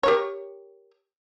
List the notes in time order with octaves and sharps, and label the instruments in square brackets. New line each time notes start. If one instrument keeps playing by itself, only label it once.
[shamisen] G4 A#4 C#5